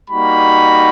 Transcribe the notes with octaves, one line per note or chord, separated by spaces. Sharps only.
G3 A#3 D#4 F#4 B5